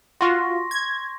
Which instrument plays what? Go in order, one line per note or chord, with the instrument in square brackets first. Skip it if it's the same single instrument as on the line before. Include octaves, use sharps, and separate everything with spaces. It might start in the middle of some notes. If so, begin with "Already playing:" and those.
[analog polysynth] F4 F#4 [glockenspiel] C6 C#6 A#6
[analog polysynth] G#6